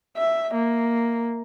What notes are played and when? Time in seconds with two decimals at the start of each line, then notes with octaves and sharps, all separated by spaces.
0.17 E5
0.54 A#3